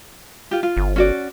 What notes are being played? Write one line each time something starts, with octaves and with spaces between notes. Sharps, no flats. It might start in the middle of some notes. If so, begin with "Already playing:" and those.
F4 G4
F4
G1
C#4 F#4 D5